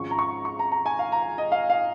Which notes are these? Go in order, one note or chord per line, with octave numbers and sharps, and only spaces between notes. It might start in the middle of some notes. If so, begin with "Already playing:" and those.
Already playing: G#1 G#2 F3 C#4 C#6
A#5
C#6
C#6
A#5
A#5
G#5
F5
A#5
D#5
F5
F5